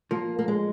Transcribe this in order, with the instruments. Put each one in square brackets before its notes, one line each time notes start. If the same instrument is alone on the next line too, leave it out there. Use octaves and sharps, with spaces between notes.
[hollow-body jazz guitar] F3 [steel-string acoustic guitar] A#3
[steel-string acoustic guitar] A#3
G#3